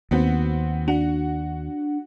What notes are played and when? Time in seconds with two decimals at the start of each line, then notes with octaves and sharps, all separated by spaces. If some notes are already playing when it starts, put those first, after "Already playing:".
0.11 D#2 B3 C4 F#4
0.88 D4 F#4